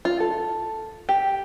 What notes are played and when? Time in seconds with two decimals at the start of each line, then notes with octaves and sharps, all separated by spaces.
0.05 F4
0.20 A4
1.09 G4